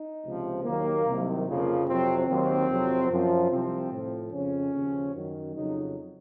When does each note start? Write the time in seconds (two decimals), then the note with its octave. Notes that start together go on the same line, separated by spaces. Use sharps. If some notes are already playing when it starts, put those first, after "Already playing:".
Already playing: D#4
0.24 C#2 C3 F3
0.65 D#2 D#3 F#3 A#3
1.06 C2 C3 D#3 F#3
1.46 F2 C#3 F3 A#3
1.87 F2 C3 F#3 C4
2.28 D#2 D#3 F#3 C4
2.69 F2 C3 F#3
3.10 F#2 F3
3.50 C2 C3 F3 C4
3.92 A2 F3
4.32 F2 C#3 F3 C#4
4.73 D#2 C#3 F3
5.14 F#2 D#3 F#3
5.55 F2 C#3 F#3 D#4